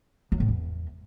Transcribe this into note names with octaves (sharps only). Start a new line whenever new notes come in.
F#3
A2
E2